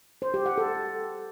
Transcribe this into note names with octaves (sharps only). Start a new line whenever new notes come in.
C5
G4
F#5
A4